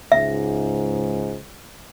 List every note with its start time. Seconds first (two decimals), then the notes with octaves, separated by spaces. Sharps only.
0.12 C#2 G#2 E5